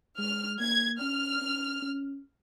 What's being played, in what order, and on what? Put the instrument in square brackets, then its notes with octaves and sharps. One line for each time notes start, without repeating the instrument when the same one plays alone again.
[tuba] G#3 [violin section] F6
[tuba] A#3 [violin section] G#6
[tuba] C#4 [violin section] F6
[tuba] C#4
C#4